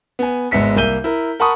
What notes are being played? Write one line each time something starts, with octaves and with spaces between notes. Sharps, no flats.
B3 G#5
G#1 G#3 B3 E5 B6 C#7
C2 A#3 E5 G6 D#7 G7
E4 A#4
A#4 F#5 A5 B5 C#6 D#6